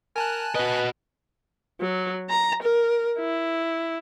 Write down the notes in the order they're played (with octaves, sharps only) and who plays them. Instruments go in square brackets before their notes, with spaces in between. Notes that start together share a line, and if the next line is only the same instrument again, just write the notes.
[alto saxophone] A#4 [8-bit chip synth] G#5 A5 F#6
[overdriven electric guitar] F#4 D#5 [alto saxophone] B4
[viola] F#3
A#5
A#4
E4